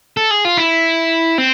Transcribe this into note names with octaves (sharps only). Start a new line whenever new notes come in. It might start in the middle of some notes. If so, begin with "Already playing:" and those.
A4
G#4
F4
E4
C4